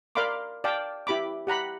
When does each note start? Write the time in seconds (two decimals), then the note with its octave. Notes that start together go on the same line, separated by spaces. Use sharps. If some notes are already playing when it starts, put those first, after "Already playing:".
0.15 A#4 D5 F5 B5 C6 D6
0.64 D5 F5 G5 A5 D6
1.07 E4 G4 B5 D6
1.47 G4 F#5 A#5 B5